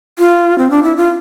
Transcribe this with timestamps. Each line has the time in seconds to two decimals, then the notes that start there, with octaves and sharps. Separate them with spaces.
0.19 F4
0.58 C4
0.70 D4
0.83 E4
0.97 F4